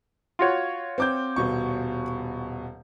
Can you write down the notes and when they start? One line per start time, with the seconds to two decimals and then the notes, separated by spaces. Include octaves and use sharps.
0.39 F4 F#4 C#5
0.98 C4 D6 G6
1.36 D#1 B2 C#6